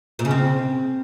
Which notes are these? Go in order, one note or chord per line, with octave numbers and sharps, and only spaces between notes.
A#2
C#3
C4